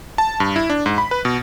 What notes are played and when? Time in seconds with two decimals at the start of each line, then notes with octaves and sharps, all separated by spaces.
0.18 A5
0.40 G2
0.56 E4
0.70 D4
0.86 G#2
0.98 B5
1.11 B4
1.25 B2